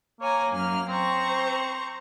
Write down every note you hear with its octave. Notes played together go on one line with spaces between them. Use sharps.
A#3 C#5 G#5 A#5
F#2 F6
C4 C5 A#5 C#6